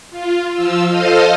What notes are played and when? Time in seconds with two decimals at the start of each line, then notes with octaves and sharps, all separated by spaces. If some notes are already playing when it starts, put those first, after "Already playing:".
0.10 F4
0.53 F3 F4 E6
0.86 A4 C5 D#5 F5 D#6 F6